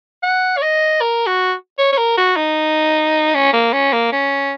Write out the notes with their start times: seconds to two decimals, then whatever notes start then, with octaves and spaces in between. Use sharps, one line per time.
0.23 F#5
0.57 C#5
0.62 D#5
1.01 A#4
1.27 F#4
1.78 C#5
1.92 C#5
1.98 A#4
2.17 F#4
2.37 D#4
3.34 C#4
3.53 A#3
3.73 C#4
3.93 A#3
4.12 C#4